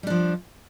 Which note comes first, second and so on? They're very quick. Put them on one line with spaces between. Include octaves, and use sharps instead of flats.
G3 D4 F3